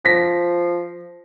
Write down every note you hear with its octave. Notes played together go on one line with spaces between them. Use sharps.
F3 A#6 B6